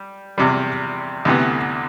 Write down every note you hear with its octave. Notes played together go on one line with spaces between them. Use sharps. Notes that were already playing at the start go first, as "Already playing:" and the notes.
Already playing: G3
E2 C3 G3
D2 C3 E3 B3